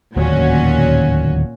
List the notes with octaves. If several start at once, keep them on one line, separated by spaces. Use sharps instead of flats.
D1 D#2 A#2 D#3 C#4 F#4